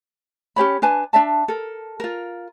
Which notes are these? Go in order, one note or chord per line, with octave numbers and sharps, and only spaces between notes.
C#4 G4 C#5 B5
D4 B4 G#5 A5
D4 D5 E5 A5
A4 A#4
F4 A#4